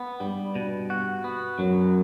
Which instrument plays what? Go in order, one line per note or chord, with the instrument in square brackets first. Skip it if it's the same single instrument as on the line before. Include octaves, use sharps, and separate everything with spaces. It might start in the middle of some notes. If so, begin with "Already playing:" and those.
Already playing: [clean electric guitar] B3
[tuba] G2 [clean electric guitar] G3
[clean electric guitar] B2
F#4
B3
[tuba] F#2 [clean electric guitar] F#3